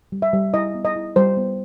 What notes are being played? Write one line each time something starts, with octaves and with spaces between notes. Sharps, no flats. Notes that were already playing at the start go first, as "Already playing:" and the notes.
G3
E5
G3
E4 D#5
B3
D#5
E4
G3 C5
B3